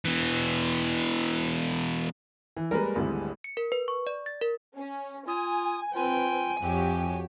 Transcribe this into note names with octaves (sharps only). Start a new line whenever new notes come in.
B2 E3
E3
G3 G#3 A#3 A#4 B4
G#1 D2 E3
C#7
A#4
B4
C#6
D5
A6
A#4
C#4
F4 G#5 D#6
C4 F4 B4 G5 G#5
F2 C4 F#4 G4 C#5